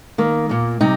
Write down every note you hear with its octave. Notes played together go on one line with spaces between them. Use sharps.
D#3 A#3
A#2 A#3
C3 G3 D#4